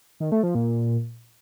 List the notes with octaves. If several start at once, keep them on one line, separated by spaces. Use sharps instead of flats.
D#3
A3
F3
A#2